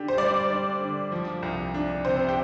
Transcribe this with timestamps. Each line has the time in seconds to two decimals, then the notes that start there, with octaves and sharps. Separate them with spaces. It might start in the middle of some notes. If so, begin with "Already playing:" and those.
Already playing: D3 D4 G4
0.08 C5
0.17 G3 D5
0.49 D4
0.81 D3
1.12 F3
1.42 C2
1.74 D4
2.05 C3 C5
2.29 G4